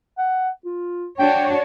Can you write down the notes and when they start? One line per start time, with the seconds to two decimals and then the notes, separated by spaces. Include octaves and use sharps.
0.18 F#5
0.65 F4
1.19 D4 F#4 C#5 G5